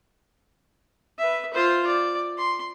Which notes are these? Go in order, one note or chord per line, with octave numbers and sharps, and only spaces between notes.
B4 E5
F4 C5
D5
C6